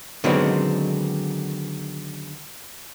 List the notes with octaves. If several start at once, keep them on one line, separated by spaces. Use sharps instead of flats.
D3 D#3 F#3 G#3 B3 C4